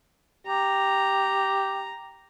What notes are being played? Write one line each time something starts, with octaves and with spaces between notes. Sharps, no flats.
G4 A#5